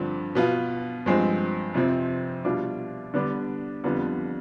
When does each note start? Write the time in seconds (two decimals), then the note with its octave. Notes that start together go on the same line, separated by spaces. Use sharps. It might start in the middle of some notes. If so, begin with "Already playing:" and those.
Already playing: G2 D3 F3 C4
0.35 B2 B3 F4
1.06 G2 F3 G#3 C4
1.74 F2 C3 F3 C4
2.45 B2 G3 D4 F4
3.14 D3 G3 B3 D4
3.84 F2 D3 G3 B3 F4